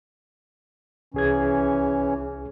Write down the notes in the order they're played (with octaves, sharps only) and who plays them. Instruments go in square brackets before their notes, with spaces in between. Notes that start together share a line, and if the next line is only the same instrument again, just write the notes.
[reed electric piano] C2 G#4 G#6 [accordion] E3 C#4